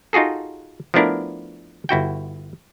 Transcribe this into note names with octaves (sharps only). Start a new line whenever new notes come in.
D#4 F4 F#4 G#4 A4
F3 A3 B3 D4 E4 A#4
G1 E4 F#4 G5